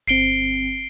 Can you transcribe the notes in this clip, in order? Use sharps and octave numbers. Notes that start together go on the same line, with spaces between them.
G1 C4 C7 D7 G7